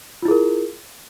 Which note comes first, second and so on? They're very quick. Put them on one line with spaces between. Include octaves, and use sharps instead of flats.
F4 E4 G#4 A#4